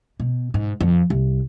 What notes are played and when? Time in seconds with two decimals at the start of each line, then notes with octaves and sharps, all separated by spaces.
0.20 B2
0.54 G#2
0.81 F2
1.10 C2